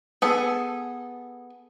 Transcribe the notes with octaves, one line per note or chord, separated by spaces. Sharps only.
B3 G#4 A4